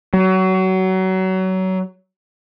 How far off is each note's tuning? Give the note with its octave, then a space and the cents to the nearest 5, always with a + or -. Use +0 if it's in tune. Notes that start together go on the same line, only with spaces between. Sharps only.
F#3 +25